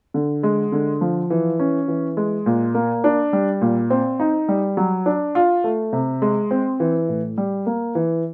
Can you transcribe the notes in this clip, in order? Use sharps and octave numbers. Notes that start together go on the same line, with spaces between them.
D3
G#3
D3
F3
E3
C#4
E3
G#3
A#2
A#3
D4
G3
A#2
C4
D#4
G3
F#3
D4
F4
A3
C3
G#3
C4
E3
A2
G3
A#3
E3